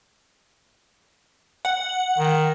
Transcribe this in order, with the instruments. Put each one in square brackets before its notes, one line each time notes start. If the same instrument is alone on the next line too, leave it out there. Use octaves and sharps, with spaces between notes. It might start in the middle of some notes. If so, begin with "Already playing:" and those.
[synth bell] F#5
[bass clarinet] D#3